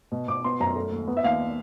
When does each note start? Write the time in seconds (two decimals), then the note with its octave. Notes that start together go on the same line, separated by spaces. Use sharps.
0.12 B2
0.27 B2 D6
0.44 B3 C6
0.60 F#2 A#5
0.75 A3
0.91 D#2
1.07 B3
1.17 E5
1.24 D#2 F5